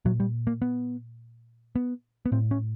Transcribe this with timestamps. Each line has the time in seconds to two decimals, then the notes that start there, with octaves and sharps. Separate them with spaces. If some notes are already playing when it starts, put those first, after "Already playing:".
0.05 A#2 F#3
0.20 G3
0.47 A#3
0.62 B3
1.76 B3
2.26 B3
2.32 A2 C4
2.51 C#4